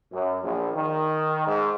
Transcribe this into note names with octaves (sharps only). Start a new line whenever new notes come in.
F#2
A#1
D#3
G#2